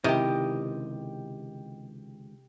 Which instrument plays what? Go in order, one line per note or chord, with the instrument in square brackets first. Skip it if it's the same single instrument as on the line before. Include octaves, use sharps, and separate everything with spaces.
[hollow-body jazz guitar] C#2 D#3 E4 [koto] C3 [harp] G4 D#5